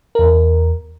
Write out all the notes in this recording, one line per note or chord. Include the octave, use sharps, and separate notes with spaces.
E2 A#4